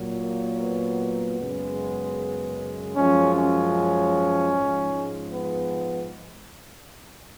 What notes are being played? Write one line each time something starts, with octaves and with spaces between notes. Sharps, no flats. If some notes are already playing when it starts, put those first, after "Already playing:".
Already playing: A#2 F#3
A#3
B3
F#2 C#3 G#3
F#2 F3 G#3 C#4
C#4
G#2 F3 G#3
B3